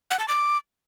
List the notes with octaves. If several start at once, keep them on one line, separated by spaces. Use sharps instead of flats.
F#5
A5
D6